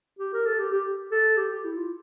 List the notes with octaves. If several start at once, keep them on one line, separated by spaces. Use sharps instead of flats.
G4
A#4
A4
G4
G4
A4
G4
G4
E4
F4